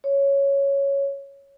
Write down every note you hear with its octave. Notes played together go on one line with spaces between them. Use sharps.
C#5